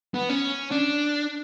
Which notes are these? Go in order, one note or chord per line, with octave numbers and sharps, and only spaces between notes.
B3
C#4
D4